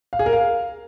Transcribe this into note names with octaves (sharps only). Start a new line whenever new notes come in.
F5
G#4
A#4
F5